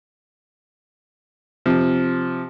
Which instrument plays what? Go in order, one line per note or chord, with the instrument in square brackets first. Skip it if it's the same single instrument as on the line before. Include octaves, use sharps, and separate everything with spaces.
[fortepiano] C3 F3